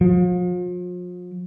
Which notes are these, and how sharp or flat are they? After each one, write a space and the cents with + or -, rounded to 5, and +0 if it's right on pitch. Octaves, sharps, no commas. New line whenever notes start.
F3 +40